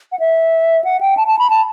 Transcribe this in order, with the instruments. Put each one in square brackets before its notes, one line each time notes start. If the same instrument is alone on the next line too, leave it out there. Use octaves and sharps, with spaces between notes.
[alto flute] F#5
E5
F#5
G5
A5
A5
B5
A5